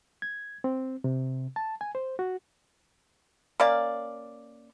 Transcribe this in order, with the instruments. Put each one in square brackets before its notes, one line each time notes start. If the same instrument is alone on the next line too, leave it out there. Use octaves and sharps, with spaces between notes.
[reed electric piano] G#6
C4
C3
A5
G#5
C5
F#4
[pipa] A#3 C#4 D5 F5